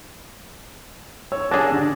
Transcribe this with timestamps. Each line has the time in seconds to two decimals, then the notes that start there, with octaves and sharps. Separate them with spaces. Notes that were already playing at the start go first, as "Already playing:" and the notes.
1.32 C#5 E6
1.51 C#4 D4 G4 G#4 A#6
1.72 D3